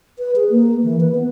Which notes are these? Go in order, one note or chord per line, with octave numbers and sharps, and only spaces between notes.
B4
G#4
A#3
E3
B4
B3